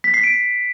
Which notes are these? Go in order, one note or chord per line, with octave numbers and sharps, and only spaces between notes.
B6
C7
D7